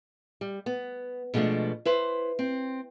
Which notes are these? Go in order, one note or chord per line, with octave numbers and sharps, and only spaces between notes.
G3
B3
B2 F3 G#3 A3 D4
E4 B4 C5
C4